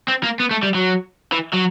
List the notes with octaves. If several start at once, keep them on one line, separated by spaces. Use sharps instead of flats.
C4
A#3
B3
A3
G3
F#3
E3
F#3